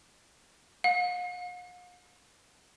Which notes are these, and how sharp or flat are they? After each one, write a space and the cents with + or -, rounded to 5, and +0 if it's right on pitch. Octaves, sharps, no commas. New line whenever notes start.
F5 +45